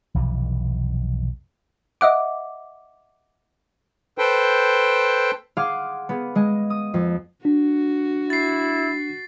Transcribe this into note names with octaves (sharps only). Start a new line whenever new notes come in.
B1 F2 C3 E3
D#5 E5 F#5 D6
A4 B4 C5 G5
G#4 F5 F#5 C6 D6 F6
B3 G#4
G#3 D#5 G#5
D#6
F2
D4 F#4
E4 A6 C7